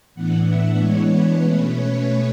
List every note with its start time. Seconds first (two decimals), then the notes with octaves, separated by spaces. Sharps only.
0.15 A2 E3 B3 D4 F#5
0.46 E5
0.78 E3 G#3 B3 D4 C#5
1.09 B4
1.41 B2 A3 C#4
1.72 C#5